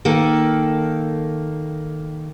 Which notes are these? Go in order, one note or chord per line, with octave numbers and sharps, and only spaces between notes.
D#3 A#3 A4